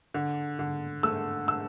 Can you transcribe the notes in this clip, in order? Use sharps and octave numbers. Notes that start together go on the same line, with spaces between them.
D3
D3
A3 E6
E6